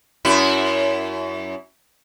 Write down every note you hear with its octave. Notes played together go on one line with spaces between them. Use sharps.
F#2 E4